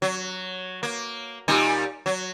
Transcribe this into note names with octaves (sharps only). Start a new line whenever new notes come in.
F#3
A#3
A#2 G3 D#4
F#3